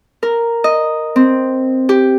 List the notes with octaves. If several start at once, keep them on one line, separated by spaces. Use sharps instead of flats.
A#4
D#5
C4
G4